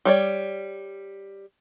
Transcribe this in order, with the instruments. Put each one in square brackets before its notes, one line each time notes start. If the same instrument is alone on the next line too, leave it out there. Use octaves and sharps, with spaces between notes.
[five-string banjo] G3 C#5 D5